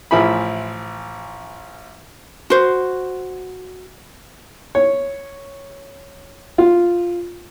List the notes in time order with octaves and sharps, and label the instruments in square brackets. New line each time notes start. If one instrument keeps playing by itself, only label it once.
[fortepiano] A1 F3 E4 G#4 B5
[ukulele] F#4 C5
[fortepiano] C#5
F4